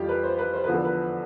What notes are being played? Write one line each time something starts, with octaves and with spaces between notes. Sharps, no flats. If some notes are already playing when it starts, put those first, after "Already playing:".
Already playing: F2 E3 G3 F4 G4
B4
C5
B4
C5
E2 D3 F3 B4
A4
B4